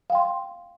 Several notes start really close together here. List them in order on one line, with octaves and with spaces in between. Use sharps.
F5 G5 C6